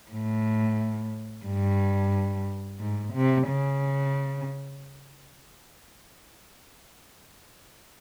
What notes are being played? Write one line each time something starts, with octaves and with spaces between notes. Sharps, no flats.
A2
G2
G#2
C3
C#3